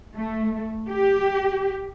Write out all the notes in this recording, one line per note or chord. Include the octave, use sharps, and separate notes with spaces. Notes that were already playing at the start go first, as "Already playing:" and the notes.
A3
G4